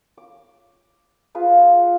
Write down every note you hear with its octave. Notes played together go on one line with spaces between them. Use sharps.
D6
F4 G#4 B4 F5